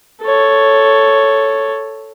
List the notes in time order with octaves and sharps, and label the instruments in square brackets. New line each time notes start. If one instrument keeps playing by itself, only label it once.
[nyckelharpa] A4 C#5